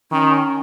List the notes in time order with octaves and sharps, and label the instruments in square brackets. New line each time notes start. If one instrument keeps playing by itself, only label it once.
[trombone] D#3 [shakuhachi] C#4